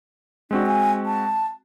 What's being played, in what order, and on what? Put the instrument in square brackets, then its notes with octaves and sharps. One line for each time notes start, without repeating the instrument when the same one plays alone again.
[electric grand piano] G#3 C4 F#4 [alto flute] D4
[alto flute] G#5
A5